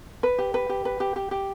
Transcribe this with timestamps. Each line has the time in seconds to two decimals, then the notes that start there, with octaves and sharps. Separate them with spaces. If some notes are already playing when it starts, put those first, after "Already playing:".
0.23 B4
0.39 G4
0.54 B4
0.69 G4
0.85 B4
1.00 G4
1.16 G4
1.31 G4